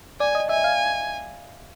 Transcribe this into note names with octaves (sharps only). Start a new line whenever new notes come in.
D5 G#5
D#5
E5 G#5
F5